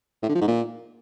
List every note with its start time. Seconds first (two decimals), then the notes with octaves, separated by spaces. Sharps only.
0.23 A2
0.29 D3
0.35 F3
0.41 G#2
0.48 A#2